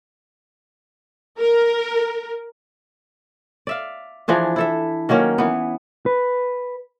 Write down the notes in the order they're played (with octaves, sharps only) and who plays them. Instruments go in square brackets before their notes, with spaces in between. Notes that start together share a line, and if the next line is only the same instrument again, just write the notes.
[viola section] A#4
[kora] D5 E5 F5
E3 F3 D4 G#4
E4 A4 E5
D#3 F#3 A#3 C#4
E3 B3
[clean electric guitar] B4